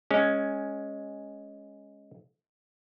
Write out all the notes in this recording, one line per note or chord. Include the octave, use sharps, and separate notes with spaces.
G#3 C#4